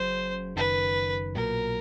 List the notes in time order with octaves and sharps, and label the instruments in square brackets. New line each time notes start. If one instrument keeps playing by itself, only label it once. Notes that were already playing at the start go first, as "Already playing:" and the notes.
Already playing: [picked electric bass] F#1 F#2 C#3 [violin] C5
[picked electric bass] F#1 F#2 D#3 [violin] B4
[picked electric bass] B1 A#2 F#3 [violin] A#4